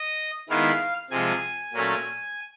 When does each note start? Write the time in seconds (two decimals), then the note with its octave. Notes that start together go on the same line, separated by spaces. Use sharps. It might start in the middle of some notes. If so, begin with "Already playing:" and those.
Already playing: D#5
0.49 D#3 G#3 B3 E4 F5
1.10 C3 F3 G#3 G#5
1.73 A#2 F#3 A3 C#4